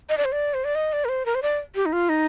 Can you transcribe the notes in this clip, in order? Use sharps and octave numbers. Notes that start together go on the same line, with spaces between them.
D#5
D5
C5
D5
C5
D5
D#5
D5
A#4
C5
A#4
C5
D5
G4
D#4
F4
D#4